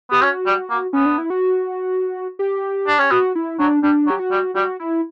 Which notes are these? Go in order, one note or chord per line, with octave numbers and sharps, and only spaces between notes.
B3 G4
C#4 F#4
G3
A#3
B3 C#4
D4
E4
F#4
G4
D4
C#4
B3 F#4
E4
F#3 D4
G3 D4
F#3
G4
F#4
G3
G3 F#4
E4